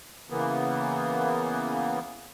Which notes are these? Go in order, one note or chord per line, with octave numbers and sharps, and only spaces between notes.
C#3 E3 A#3 B3